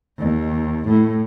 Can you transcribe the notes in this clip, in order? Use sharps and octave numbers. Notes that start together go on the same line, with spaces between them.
D#2
A2